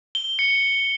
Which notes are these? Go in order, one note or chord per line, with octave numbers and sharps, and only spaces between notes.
G7
C#7